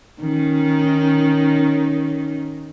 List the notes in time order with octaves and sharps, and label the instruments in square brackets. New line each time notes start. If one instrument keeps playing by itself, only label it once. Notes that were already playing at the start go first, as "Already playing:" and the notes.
[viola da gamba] D#3 C#4 D#4